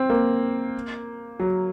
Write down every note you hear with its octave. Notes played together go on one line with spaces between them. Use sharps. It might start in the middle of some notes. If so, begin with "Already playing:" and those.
Already playing: C4
A#3
F#3